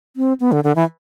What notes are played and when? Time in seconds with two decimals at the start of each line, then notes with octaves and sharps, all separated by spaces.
0.17 C4
0.40 B3
0.52 D3
0.64 D3
0.76 E3